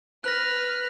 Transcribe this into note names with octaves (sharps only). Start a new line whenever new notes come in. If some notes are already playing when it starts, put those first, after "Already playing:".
B4 F6 F#6 A#6